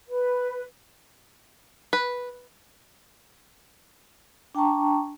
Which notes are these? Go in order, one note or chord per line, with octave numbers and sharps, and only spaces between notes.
B4
B4
D4 G5 A5 A#5 C#6